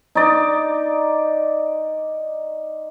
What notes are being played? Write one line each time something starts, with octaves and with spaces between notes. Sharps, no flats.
D#4 D5